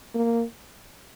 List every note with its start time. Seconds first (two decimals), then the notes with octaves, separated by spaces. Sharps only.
0.15 A#3